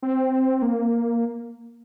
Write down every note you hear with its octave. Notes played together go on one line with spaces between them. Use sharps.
C4
A#3